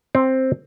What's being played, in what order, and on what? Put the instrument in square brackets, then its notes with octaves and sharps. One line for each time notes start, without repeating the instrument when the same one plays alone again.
[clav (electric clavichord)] C4